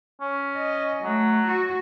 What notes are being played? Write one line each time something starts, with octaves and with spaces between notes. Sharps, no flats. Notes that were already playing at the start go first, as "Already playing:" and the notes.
C#4
D#5
F#3 A3
F#4